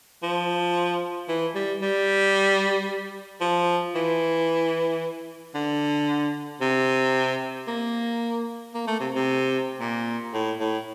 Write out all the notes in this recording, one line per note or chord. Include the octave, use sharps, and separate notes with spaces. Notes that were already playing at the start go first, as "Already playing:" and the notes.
F3
E3
G3
G3
F3
E3
D3
C3
A#3
A#3
A3
C3
C3
A#2
A2
A2